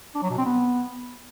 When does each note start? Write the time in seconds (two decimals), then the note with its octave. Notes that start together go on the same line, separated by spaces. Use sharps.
0.15 D4
0.23 F#3
0.30 B2
0.38 C4
0.45 B3